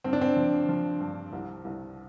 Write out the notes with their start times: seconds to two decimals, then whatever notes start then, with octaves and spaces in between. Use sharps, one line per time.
0.04 G2 C4
0.13 D4
0.21 C4
0.36 F3
0.69 F3
1.00 G2
1.33 C2
1.65 C2